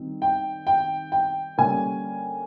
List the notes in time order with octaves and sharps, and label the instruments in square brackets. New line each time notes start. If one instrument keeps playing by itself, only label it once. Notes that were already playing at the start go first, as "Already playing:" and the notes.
Already playing: [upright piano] D#3 G3 C4 D#4
G5
G5
G5
D3 G3 A#3 C#4 G#5